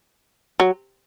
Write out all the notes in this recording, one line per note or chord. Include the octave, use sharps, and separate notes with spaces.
F#3